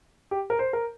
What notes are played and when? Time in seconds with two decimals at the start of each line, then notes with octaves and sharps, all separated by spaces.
0.31 G4
0.50 A#4
0.59 C5
0.73 A#4